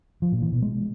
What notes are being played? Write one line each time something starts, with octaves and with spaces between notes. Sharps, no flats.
F3
A#2
E3
B2
G#3